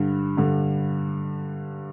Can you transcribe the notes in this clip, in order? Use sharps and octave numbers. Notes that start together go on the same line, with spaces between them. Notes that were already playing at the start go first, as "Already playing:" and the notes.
Already playing: G2 D3
G2 D3